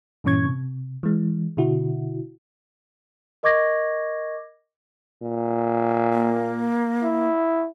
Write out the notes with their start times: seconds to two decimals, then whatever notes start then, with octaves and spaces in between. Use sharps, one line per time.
0.24 G2 A#2 E3 C#4 C#6 G#6
0.45 C3
1.03 E3 G#3
1.57 B2 D3 E4 F#4
3.43 A#4 D#5 C#6 D6 G#6 A#6
5.22 A#2
6.13 A#3
7.03 E4